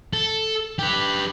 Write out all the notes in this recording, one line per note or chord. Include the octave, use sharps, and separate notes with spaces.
A4
G4 B4